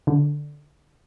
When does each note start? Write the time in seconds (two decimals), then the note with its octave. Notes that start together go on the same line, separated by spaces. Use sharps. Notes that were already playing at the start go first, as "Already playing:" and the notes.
0.07 D3